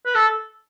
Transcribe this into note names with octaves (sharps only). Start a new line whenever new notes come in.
B4
A4